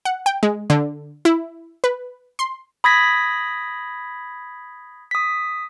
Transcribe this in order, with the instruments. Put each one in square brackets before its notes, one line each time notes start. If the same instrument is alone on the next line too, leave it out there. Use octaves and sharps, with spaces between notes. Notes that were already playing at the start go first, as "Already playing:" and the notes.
[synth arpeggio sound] F#5
G5
G#3
D3
E4
B4
C6
[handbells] B5 D#6 G#6 A#6 B6
D#6 B6